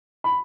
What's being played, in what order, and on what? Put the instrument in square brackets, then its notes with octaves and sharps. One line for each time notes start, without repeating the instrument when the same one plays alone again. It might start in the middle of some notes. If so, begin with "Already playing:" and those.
[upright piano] B5